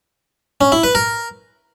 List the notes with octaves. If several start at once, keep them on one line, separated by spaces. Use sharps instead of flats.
C#4
E4
B4
A#4